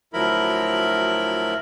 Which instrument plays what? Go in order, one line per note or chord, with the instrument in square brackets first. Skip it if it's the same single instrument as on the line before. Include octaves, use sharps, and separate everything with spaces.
[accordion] D2 F3 F#3 E4 A#4 B5